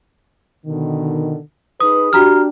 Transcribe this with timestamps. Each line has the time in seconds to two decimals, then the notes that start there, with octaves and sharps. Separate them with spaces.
0.67 B2 D3 D#3
1.80 D#4 G#4 B4 D#6
2.13 D4 F#4 G4 A#5 F6